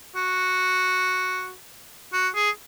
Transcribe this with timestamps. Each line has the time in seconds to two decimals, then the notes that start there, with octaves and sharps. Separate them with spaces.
0.16 F#4
2.13 F#4
2.35 G#4